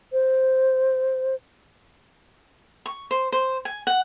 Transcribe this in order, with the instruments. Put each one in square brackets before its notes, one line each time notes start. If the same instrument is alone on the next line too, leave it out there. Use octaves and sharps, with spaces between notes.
[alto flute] C5
[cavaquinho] C#6
C5
C5
G#5
F#5